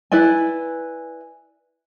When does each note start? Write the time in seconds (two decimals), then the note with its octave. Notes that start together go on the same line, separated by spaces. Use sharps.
0.12 E4 B4 D5 G#5